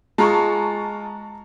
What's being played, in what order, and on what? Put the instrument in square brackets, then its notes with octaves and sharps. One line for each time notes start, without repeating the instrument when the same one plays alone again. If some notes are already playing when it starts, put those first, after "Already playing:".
[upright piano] G#3 F4 [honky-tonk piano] A5 A#5 C#6